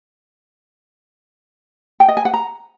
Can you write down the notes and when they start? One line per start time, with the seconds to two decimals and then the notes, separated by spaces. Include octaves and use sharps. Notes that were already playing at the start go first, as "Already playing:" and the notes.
2.00 G5
2.08 D#5
2.17 G#5
2.25 F#5
2.34 A#5